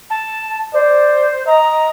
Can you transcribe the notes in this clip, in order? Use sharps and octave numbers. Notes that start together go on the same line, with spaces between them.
A5
C5 D5
D#5 A#5